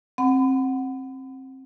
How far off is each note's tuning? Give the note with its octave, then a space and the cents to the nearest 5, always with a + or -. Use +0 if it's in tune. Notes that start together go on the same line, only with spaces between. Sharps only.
C4 +20 F#5 +0 B5 +40